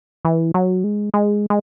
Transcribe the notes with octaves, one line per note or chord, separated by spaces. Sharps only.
E3
F#3
G#3
G#3
G#3